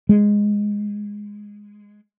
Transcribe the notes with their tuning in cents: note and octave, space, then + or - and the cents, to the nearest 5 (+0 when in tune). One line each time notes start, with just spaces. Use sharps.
G#3 -5